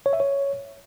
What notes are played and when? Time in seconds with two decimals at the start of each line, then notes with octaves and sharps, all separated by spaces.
0.06 C#5
0.13 E5
0.20 C#5